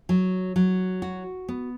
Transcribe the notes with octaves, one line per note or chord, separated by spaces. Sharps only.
F#3
F#3
F#4
B3